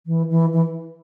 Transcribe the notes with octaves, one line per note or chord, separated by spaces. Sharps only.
E3
E3
E3